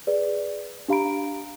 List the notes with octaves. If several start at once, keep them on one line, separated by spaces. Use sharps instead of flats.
G#4 B4 D5
D4 G4 F5 A#5 B5 D7